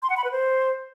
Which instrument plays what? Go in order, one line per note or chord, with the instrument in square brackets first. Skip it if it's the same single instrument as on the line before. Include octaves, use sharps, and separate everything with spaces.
[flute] C6
F#5
B5
B4
C5